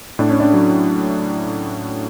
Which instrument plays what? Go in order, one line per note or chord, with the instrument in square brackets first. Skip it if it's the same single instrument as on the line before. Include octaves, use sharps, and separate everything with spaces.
[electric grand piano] A2 [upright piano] D4
[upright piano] C#4
D4
[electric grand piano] F#3